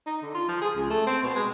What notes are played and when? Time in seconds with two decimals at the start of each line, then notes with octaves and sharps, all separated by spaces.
0.06 D#4
0.22 D3
0.35 F4
0.48 F3
0.61 G#4
0.75 C#2
0.90 A3
1.07 C4
1.23 B2
1.35 G#3